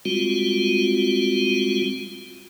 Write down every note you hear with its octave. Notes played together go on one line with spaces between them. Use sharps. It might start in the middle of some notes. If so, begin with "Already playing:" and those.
G3 G#3 C4 F4 F#4